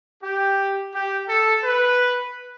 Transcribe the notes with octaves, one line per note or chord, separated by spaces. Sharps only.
G4
G4
A4
B4